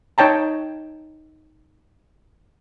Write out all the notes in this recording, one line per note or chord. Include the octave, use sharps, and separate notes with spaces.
D#4 C#5 G5 A5 A#5